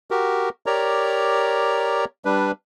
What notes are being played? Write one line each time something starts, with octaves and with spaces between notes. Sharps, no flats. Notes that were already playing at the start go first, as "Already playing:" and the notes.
F#4 G4 A#4
G4 A#4 C#5 D5 A#5
G3 D4 B4